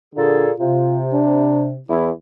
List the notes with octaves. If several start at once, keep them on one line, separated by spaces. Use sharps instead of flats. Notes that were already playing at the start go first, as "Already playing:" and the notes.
A#2 D3 G#4 A4
C3 F4
D4
E2 E4